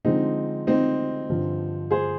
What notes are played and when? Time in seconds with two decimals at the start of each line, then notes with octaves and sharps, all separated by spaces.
0.05 D3 F3 G#3 C4 D#4
0.67 C4 D#4
1.30 G2 D3 F3
1.91 G#4 C5